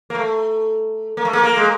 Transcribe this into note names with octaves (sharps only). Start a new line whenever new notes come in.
A#3
A3
A#3
A3
A#3
A#3
G#3